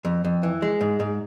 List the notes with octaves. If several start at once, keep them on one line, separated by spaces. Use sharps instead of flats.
F2
F2
E3
G#3
G#2
G#2